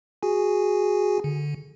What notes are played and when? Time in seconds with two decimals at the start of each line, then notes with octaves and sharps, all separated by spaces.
0.23 F#4 G#4 G#5
1.24 D3